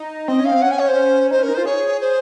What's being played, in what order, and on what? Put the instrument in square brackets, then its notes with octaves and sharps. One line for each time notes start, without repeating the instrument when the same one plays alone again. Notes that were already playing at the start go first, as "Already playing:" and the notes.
Already playing: [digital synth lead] D#4
[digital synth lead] C4 [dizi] D#5
[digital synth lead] C#4
[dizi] F5
[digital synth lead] C4
[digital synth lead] C#4 [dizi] F#5
[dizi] G#5
C#5
C5
[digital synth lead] D#4 [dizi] C5
[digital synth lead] C#4 [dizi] A#4
[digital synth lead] D#4
[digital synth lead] F4 [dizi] C5
[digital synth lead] G#4 [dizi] C#5
[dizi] C5